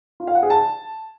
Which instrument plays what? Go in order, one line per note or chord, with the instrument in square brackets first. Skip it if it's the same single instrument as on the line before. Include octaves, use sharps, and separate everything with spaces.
[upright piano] F4
F5
F#5
G#4
A5